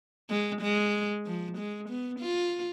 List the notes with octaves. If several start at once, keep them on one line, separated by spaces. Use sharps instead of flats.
G#3
G#3
F3
G#3
B3
F4